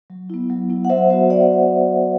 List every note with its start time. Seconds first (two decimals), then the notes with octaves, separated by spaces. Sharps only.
0.10 F#3
0.30 B3 E4
0.50 F#3
0.70 B3 E4
0.85 F#5
0.90 F#3 C5 E5
1.10 B3 F#4 C5 E5
1.29 F#3 D5 F#5
1.40 D5